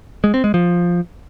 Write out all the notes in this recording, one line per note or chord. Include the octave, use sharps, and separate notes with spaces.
G#3
C4
G#3
F3